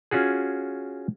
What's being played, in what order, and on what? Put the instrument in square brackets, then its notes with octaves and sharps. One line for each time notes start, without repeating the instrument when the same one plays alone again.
[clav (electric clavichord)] C#4 F4 F#4 G#4